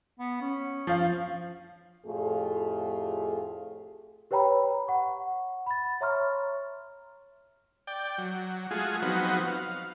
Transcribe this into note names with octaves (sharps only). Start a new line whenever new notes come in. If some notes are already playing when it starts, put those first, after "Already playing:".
B3
C#4
F3 F5
F2 A2 A3 F4 G4 G#4
G4 B4 C#5 G5 A#5 B5
F#5 C#6
B5 A6
C#5 E5 A#5 C6 C#6 F6
D5 G5
F#3
G#3 A3 F4 F#4 G#4
F3 F#3 B3 C4 D#4 F#4
F5